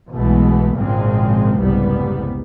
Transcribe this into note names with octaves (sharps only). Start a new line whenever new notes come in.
B1 B2 E3 G#3 A3 B3
G#1 A#2 C#3 F3 G#3 C4
F1 C2 G#2 C#3 G3 B3